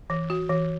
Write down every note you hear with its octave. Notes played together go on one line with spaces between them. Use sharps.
E3
F#4
E3